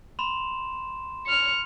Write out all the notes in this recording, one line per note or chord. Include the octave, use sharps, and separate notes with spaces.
B5 C6 E7
F6 C#7